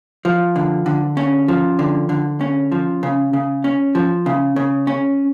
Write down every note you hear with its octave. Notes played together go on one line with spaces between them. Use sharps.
F3
D3
D3
C#4
F3
D3
D3
C#4
F3
C#3
C#3
C#4
F3
C#3
C#3
C#4